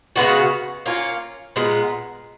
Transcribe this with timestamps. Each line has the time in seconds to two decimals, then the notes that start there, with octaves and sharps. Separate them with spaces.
0.16 C#3 G#3 B3 F#4
0.86 A#3 C#4 F4
1.56 A#2 G#3 B3